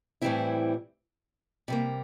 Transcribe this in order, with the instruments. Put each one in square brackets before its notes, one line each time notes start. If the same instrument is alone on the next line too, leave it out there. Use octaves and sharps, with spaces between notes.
[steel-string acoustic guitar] A2 E3 G3 C4 E4
C3 G3 A#3